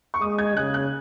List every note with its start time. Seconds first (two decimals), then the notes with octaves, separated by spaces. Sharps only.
0.14 C#6
0.21 G#3 D#6
0.38 G#6
0.56 C#3 F#6
0.74 F#6